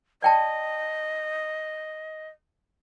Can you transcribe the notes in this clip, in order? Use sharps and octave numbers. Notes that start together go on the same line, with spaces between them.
D5 D#5 G5 A5